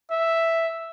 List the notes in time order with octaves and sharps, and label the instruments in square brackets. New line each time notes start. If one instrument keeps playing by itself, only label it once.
[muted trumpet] E5